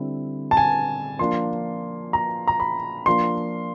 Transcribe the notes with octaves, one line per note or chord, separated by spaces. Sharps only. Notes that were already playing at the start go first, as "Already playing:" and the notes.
Already playing: D3 G3 C4 E4
A5
G#5
F3 A#3 D4 F4 C6
A#5
A#5
B5
F3 A#3 D4 F4 C6